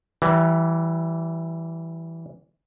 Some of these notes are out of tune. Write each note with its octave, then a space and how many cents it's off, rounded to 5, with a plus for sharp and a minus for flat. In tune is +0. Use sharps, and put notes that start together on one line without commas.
E3 +0 G3 -30